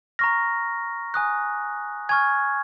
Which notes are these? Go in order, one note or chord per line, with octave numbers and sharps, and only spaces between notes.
A#5 C#6 F6 A#6
G#5 D#6 F#6
G#5 C#6 F6 G#6